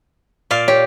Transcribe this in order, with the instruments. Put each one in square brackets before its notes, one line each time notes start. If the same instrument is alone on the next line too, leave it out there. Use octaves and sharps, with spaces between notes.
[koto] A#2 D5 F5
[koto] G4 [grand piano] C#5